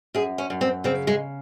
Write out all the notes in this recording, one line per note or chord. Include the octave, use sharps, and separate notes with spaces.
F#2 G#4
C#4
F#2
C4
C#3 C4
G#3